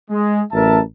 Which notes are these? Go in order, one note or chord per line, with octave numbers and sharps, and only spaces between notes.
G#3
A1 F#2 A#4 E5 A5